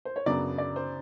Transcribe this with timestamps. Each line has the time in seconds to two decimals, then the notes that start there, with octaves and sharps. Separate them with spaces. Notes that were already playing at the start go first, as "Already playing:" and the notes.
0.05 C5
0.16 C#5
0.26 F#2 C#3 F#3 B3 D4 D5
0.58 D5
0.76 C5